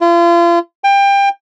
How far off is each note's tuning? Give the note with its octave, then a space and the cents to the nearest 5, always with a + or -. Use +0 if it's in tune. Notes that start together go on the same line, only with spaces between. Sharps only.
F4 -35
G5 +25